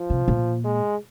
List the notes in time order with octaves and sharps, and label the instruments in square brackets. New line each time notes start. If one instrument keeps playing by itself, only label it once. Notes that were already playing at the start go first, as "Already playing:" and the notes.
Already playing: [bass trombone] F3
[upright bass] C3
A#2
[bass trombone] G#3